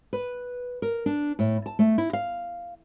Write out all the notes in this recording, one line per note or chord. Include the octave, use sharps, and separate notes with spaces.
B4
A#4
D4
A2
A5
A3
E4
F5